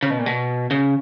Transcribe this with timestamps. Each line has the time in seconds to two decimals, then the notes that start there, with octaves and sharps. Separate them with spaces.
0.03 C#3
0.10 B2
0.19 A#2
0.26 B2
0.71 C#3